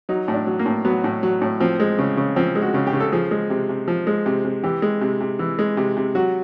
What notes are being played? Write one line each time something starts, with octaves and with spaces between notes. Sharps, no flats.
F#3 D#4
A2
D4
F#3
A#3
A2
F#3 B3
A2
F#3
A2
F3 C4
G#3
C#3
C#3
F3 C4
G#3
F#4
C#3
G4
C#3
A4
F3 G#4
G#3
C3
C3
F3
G#3
C3
C3
E3 G4
G#3
C3
C3
E3
G#3
C3
C3
F#3 F#4